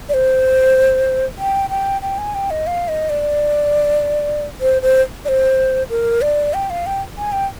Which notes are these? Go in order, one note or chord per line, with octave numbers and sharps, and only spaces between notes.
D5
C5
G5
G5
G5
G#5
G5
D#5
F5
D#5
D5
C5
C5
D5
C5
A#4
D5
G5
F5
G5
G#5
G5